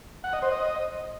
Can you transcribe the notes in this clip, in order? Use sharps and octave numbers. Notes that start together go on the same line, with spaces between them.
F#5
D#5
C5
D#5